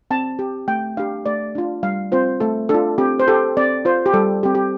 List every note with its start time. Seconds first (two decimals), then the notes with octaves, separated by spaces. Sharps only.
0.11 C4 A5
0.39 G4
0.68 A3 G5
0.97 D4 G4 F5
1.26 A3 D5
1.55 D4 F4
1.83 G3 F5
2.12 C4 F4 C5
2.40 A3 A4
2.69 D4 F4 A4
2.98 C4 G4
3.20 C5
3.28 G4 A4
3.57 C4 D5
3.85 F4 C5
4.06 G4
4.14 G3 A4
4.43 C4 G4
4.55 G4